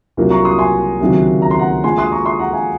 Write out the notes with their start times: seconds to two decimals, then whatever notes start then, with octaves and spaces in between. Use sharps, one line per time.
0.17 C2 A#2 F#3 A#3
0.30 A#5 C#6
0.45 C6 D#6
0.58 G#5 C6
1.00 C#2 C3 D#3 F#3 A#3
1.42 A#5
1.51 C6
1.59 F#5 A#5
1.84 A#2 G#3 G#5 C6
1.98 C6 D#6
2.12 A#5 C#6
2.26 C6 D#6
2.39 F#5 A#5
2.53 F5 G#5